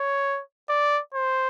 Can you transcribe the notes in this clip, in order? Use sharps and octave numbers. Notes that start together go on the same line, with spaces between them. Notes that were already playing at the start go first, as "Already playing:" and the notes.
Already playing: C#5
D5
C5